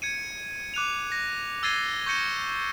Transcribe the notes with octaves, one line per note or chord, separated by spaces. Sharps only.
G#6 C#7 D#7
D6 F#6 D#7 F7
A#6
E6 G#6 A6 C7 D#7 G7
C#6 G6 A#6 C#7 D#7 G7